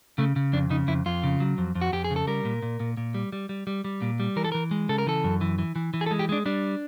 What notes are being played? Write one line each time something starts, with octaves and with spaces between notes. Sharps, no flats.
C#3 A3
C#3
F2 D4
C#3 D#4
F2 E4
F2 F4
C#3
F#3
F2
F2
F#4
F2 G4
G#4
C#3
A4
G3 A#4
A#2
A#2
A#2
A#2
G3
G3
G3
G3
G3
A#2
G3
E3 A#4
A4
E3 A#4
G#3
C#3 A4
A#4
E3 A4
F#2
E3
E3
E3
E3
G#4
A4
G#3
G4
G#3 D4
G3 D4